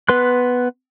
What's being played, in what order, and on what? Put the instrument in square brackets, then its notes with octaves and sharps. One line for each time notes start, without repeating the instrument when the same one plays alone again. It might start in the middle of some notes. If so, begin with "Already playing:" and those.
[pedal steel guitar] B3 B4 C6 F#6